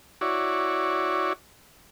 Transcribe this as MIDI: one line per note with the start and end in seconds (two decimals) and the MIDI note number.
0.21 1.33 64
0.21 1.33 66
0.21 1.33 73
0.21 1.33 74